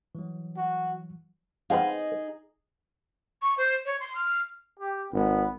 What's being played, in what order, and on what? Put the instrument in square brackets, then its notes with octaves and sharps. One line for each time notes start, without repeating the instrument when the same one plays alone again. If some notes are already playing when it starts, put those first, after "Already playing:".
[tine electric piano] E3 F#3
[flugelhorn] F#4
[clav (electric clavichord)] B3 C4 F5 [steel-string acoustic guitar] D#4 G#4 D#5
[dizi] C#6
C5
C#5
C6
F6
[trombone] G4
[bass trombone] G#1 [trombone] B3